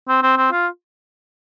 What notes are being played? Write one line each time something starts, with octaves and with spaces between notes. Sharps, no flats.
C4
C4
C4
F4